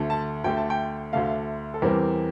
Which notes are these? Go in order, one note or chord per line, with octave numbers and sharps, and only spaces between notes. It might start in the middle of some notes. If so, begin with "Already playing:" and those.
Already playing: D2 D3 A3
A5
D2 D3 A3 G5
A5
G5
D2 D3 A3 F5
A4
E2 E3 G3 C4 A#4